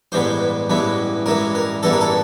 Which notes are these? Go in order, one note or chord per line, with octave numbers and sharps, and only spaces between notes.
A1 G2 E3 G#3 B3 C5
A1 G2 E3 G#3 B3
A1 G2 E3 G#3 B3 A#4
A#4
A1 G2 E3 G#3 B3 A4
A#4
A4